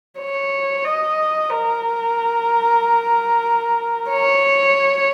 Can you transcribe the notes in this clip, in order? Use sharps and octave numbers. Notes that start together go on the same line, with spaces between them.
C#5
D#5
A#4
C#5